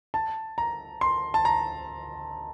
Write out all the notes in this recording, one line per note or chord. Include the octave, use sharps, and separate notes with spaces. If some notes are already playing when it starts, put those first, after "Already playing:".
A5
A#5
C6
A5
A#5